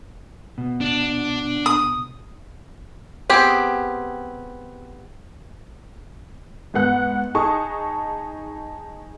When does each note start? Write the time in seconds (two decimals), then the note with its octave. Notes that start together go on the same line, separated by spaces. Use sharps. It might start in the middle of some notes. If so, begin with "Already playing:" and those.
0.58 B2
0.81 D4
1.66 D#6
3.30 B3 C4 G4 G#4
6.74 G#2 B3 F#5 F#6
7.35 D#4 G#4 A5 C#6 D#6